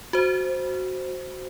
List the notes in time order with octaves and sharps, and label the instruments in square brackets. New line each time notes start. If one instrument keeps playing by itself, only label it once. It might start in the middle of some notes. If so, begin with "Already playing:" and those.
[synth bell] F#4 C5